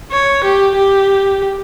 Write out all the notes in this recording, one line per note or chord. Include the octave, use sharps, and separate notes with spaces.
C#5
G4
G4